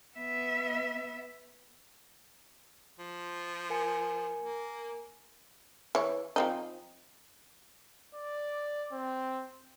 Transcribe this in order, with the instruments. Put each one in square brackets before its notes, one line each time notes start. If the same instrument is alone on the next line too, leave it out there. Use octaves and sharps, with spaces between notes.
[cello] B3 E5
[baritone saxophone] F3
[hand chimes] A#4 G#5 C#7
[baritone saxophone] A#3
[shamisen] E3 C#5
F3 C4 D#4
[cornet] D5
C4